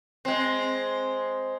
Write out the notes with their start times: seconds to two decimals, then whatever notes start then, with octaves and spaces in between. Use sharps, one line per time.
0.25 G#3 C4